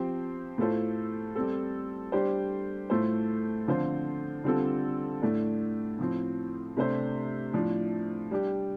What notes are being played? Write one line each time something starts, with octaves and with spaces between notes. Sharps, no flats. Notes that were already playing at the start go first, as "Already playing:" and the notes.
Already playing: F3 C4 G4 C5
A2 A3 F4 A4 C5
G3 C4 A4
G3 D4 G4 C5
A2 A3 F4 A4 C5
D3 F3 C4 F4 C5
D3 G3 C4 F4 A4
A2 A3 D4
A2 F3 C4
C3 A3 D4 G4 C5
A2 F3 D4
G3 D4 G4